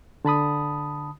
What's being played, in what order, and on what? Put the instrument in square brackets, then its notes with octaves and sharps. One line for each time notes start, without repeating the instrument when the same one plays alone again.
[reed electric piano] D3 A5 B5 D#6